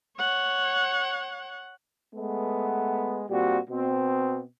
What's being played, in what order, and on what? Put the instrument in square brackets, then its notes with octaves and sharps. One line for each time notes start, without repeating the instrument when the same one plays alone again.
[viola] C#5 F#5
[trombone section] G#3 A3 B3
A#2 G3 C4 F#4
B2 C4